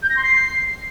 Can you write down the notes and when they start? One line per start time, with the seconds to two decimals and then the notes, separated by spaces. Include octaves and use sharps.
0.03 G6
0.10 A#6
0.16 C6
0.23 C7